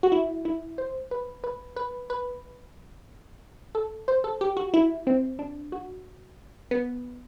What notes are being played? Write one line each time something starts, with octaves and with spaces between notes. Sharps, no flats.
F#4
E4
E4
C5
B4
B4
B4
B4
A4
C5
A4
G4
F#4
E4
C4
D4
F#4
B3